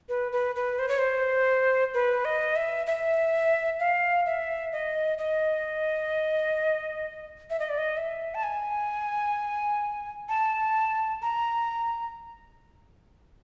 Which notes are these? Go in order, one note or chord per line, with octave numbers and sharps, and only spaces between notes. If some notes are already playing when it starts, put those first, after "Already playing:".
B4
B4
B4
C5
C#5
C5
B4
D#5
E5
E5
F5
E5
D#5
D#5
E5
D#5
D5
D#5
E5
A5
G#5
A5
A#5